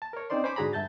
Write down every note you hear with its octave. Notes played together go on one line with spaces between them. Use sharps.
A5
A#4 C#5
C4 C#4 D#4 C5 D5 C6
C5 C#5 G#5 B5 D6
G#2 D3 F#4 G#4 A#5 B5
G2 E5 A5 G6 A6